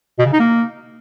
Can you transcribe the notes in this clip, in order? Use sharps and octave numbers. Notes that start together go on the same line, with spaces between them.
B2
C#3
D#4
A#3